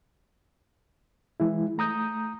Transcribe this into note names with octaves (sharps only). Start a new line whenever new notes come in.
E3 G#3 E4
A3 A#5 D#6 G6